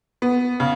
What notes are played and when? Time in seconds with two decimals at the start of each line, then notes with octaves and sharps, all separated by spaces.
0.22 B3
0.60 C#3